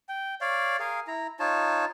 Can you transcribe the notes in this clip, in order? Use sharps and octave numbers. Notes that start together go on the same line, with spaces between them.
G5
C#5 D5 F5
G#4 A#4 F5
E4 A#5
D#4 F4 C#5 A5